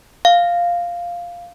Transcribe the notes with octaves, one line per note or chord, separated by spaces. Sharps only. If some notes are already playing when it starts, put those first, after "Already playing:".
F5